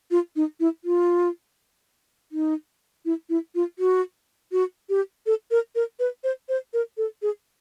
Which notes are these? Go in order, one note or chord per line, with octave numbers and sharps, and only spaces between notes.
F4
D#4
E4
F4
D#4
E4
E4
F4
F#4
F#4
G4
A4
A#4
A#4
B4
C5
C5
A#4
A4
G#4